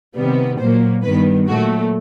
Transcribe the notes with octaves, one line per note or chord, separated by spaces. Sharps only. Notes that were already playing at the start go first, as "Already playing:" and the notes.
C3 D#3 G3 B3
A#2 F#3 A#3 C5
G2 D#3 G3 B3 B4
A#2 F#3 A3 F#4